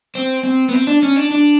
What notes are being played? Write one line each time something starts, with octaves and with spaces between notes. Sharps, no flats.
C4
C4
B3
C4
D4
C#4
D4
D4